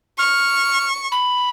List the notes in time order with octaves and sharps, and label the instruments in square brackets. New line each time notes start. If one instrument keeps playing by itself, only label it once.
[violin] C#6 [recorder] F6
[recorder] B5